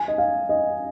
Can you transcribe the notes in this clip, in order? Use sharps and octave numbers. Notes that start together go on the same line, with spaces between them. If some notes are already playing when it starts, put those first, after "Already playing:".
Already playing: G#5
D#5
F5
D#5